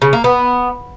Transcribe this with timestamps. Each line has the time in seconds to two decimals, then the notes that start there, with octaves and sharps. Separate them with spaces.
0.02 C#3
0.13 A#3
0.24 B3